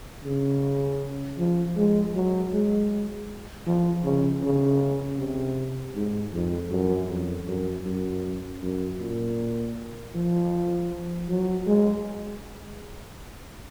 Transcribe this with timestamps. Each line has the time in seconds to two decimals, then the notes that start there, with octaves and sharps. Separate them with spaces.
0.24 C#3
1.38 F3
1.76 G#3
2.15 F#3
2.53 G#3
3.67 F3
4.04 C#3
4.43 C#3
5.19 C3
5.95 G#2
6.33 F2
6.71 F#2
7.09 F2
7.48 F#2
7.86 F#2
8.62 F#2
9.00 A#2
10.15 F3
11.29 F#3
11.66 G#3